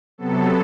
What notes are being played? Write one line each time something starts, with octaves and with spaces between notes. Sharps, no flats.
C3 F#3 B3 A4